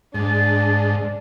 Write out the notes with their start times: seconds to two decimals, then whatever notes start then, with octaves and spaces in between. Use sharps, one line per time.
0.14 G#2 D4 A6